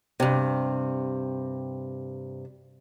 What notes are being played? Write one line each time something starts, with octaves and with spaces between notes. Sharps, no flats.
G2 C3